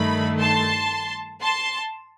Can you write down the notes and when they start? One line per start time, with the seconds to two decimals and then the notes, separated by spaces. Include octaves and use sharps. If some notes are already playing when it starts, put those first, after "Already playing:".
Already playing: G2 D#3 A3 B5
0.40 A5 C6
1.42 A5 C6